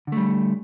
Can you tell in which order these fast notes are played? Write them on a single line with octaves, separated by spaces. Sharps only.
D3 A3 G3